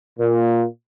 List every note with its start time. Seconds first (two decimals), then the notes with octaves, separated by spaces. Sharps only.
0.20 A#2